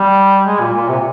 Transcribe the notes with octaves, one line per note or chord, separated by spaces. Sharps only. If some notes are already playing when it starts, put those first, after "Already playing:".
Already playing: G3
G#3
A#2
A#2
C3